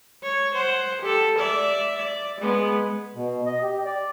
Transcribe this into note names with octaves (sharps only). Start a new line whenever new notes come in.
C#5
C5 F#5
G4 A4
D5 E5
D5
G#3 B3
B2
D#5
G4
D5